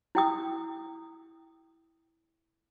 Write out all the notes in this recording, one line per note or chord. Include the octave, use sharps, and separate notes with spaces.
E4 G5 D#6